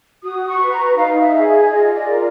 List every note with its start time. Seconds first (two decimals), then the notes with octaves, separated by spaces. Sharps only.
0.23 F#4 D#6
0.47 C#6
0.60 B4
0.72 A#5
0.96 D#4 F5
1.21 E5
1.33 G#4
1.69 F4 D#5
1.94 D5
2.06 A#4